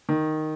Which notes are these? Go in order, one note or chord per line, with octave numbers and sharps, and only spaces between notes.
D#3